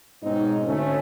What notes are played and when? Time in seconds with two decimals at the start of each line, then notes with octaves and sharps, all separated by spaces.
0.23 G#2 B2 C4 C#4 D#4
0.67 D2 A3 C#4